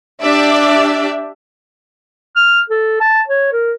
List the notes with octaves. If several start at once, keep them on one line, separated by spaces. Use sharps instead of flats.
D4 G4 D5 E5
F6
A4
A5
C#5
A#4